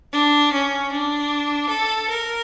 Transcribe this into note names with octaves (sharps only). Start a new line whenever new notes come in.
D4
C#4
D4
A4
A#4